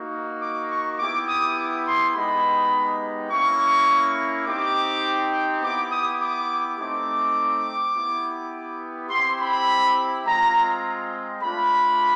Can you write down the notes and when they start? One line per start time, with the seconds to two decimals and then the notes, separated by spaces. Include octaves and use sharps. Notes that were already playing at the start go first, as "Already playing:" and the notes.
Already playing: A#3 D#4 F#4
0.41 D6
0.71 C#6
0.99 B3 E4 G4 D6
1.28 D#6
1.57 D6
1.87 C6
2.15 G#3 B3 D#4 G4 B5
3.31 A#3 C#4 E4 C#6
4.47 C4 D#4 G4 D6
5.62 B3 E4 G4 D6
5.91 D#6
6.21 D6
6.78 A3 C4 D#4 D6
7.94 B3 E4 G4
9.10 C4 E4 G4 C6
9.39 B5
10.25 G#3 C4 F4 A#5
11.42 A3 D4 F4 B5